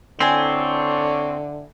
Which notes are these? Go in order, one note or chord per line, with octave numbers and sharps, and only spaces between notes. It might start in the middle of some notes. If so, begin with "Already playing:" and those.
D3 C4 D4 E4 A4 C#5 G#5